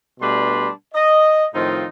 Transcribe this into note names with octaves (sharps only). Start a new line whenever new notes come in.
B2 G3 A3 D4 B4 C6
D#5
A2 D#3 F3 C4 D#4 F4